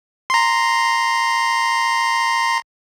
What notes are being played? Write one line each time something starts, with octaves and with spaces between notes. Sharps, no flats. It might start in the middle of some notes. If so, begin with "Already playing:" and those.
A#5 C6